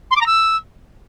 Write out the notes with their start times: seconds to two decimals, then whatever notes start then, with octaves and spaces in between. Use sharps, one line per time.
0.10 C6
0.16 D6
0.21 A#5
0.26 E6